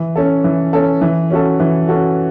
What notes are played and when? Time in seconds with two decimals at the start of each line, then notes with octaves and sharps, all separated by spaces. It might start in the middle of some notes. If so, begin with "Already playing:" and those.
Already playing: E3
0.16 C#4 A4
0.44 E3
0.73 C#4 A4
1.01 E3
1.30 C#4 F#4 A4
1.60 E3
1.88 C#4 F#4 A4